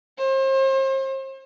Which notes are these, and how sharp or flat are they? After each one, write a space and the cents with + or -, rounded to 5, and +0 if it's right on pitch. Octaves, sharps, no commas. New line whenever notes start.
C5 +40